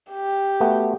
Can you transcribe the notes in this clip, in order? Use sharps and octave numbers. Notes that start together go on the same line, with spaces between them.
G4
A3 B3 F#4